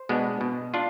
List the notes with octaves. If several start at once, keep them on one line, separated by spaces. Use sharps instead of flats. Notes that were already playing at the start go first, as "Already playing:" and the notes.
Already playing: C5
B2 G#3 B3 D4
B2
D4 F4